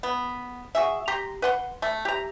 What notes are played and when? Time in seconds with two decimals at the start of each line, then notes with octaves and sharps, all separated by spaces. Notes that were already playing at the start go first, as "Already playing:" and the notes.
0.03 B3
0.75 F#4 G#4 E5
1.08 G4 A#5 C6
1.42 B4 F#5 C6
1.82 A3
2.05 G4 A#5